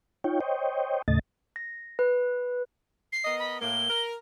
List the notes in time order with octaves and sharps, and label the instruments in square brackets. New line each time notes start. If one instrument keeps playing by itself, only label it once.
[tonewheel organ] D#4 F4 C#5 G5
C5 C#5 D#5 G5
D#2 A2 C#3 A3 D#5 A6
[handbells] A#6
B4
[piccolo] C7
[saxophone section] B3 A#4 D#5
[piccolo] B5
[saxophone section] A2 A#3 [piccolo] G7
[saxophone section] A#4